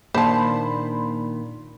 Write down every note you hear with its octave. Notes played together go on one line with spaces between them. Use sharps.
A#2 D#3 A#3 D4 C5 A5 B5 C6